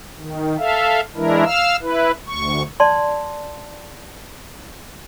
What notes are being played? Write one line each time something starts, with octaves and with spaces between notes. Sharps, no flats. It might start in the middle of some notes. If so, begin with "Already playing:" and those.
D#3
A4 E5 F5
E3 G#3 D4 E4 A#4
F5 E6 F6
E4 B4
D2 C#6
D5 A5 C6